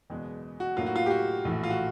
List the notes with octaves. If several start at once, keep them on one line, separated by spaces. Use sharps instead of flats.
F#1 E2 B2 G#3 B3
F#4
A2 F#3 A#3 D#4 F4
F#4
F4
G4
F#4
A#1 A2 E3
F4
F#4